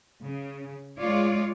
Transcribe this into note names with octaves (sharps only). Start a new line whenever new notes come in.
C#3
G#3 F4 C#5 D5